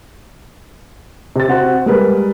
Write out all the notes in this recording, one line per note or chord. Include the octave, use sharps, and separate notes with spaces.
C3 A6
C4 F#4
G3 G#3 A#4 B4